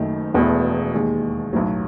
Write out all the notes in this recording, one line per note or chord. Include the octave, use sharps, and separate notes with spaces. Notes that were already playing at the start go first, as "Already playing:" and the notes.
Already playing: F#1 F#2 D#3 A3 D#4
E1 E2 B2 A3 E4
D#2 D#3 G#3
B1 A2 F#3